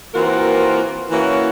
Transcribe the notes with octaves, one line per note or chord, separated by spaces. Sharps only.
E3 A#3 C4 F4 F#4 A#4
E3 A#3 C#4 E4 F#4 C#5